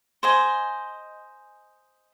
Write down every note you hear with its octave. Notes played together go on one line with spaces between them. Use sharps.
C5 D#5 G#5